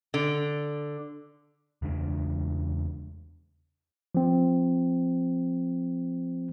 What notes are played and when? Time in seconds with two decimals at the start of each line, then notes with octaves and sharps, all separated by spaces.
0.14 D3
1.82 E2 C#3 G#3 D4
4.15 F3 C4